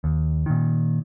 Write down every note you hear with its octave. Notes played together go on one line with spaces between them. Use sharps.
D#2
A#2 D#3